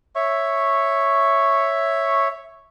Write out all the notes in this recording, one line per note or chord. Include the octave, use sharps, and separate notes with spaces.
C#5 E5 C#6